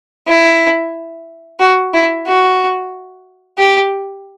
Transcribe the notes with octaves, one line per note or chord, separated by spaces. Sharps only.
E4
F#4
E4
F#4
G4